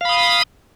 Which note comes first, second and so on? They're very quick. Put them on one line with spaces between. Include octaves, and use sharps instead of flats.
F5 B5 D#6